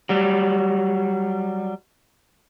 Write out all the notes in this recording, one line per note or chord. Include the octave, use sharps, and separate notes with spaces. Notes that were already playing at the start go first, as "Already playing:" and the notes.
F#3 G3